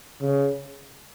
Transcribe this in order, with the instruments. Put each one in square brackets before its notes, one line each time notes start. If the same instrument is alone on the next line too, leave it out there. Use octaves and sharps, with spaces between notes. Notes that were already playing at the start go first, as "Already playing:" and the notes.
[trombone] C#3